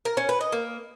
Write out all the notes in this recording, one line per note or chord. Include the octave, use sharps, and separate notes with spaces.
A#4
C#4
B4
D#5
A#3